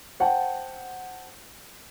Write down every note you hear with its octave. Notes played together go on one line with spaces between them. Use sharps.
C5 F#5 G5 A5